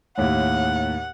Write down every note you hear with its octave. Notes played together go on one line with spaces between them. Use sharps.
D#2 A2 F#5